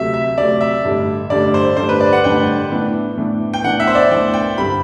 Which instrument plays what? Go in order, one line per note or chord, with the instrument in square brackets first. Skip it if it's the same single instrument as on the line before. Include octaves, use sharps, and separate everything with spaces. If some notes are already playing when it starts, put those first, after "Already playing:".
Already playing: [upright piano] D2 C3 F#3 A3 [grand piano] E5
[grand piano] E5
[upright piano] D2 C3 F#3 A3 [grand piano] D5
[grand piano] E5
[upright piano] A1 G2 D3 G3 D4
[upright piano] A1 G2 D3 G3 D4 [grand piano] D5
[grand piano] C5
[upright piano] A1 G2 D3 G3 D4 [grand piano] C5
[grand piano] B4
D5
F#5
[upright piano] A1 G2 D3 G3 D4 [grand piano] G5
[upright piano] A2 E3 B3 D4
A2 E3 B3 D4
[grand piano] G5
[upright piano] A2 E3 B3 D4 [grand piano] F#5
[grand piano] E5
C5
D5
[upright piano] A2 E3 B3 D4 [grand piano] G5
[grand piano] G5
[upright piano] G2 D3 G3 C4 [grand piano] B5